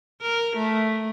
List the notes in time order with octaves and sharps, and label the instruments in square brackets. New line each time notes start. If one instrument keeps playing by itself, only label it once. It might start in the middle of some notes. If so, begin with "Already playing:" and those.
[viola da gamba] A#4
A3